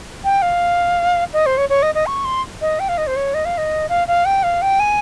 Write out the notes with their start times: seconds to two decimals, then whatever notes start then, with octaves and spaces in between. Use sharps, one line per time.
0.24 G5
0.42 F5
1.33 D#5
1.46 C5
1.57 C#5
1.69 C#5
1.82 D#5
1.95 D#5
2.06 C#6
2.25 C6
2.61 D#5
2.79 G5
2.89 F5
2.98 D#5
3.07 C5
3.16 C#5
3.34 D#5
3.45 F5
3.58 D#5
3.89 F5
4.08 F5
4.25 G5
4.43 F5
4.62 G5
4.80 G#5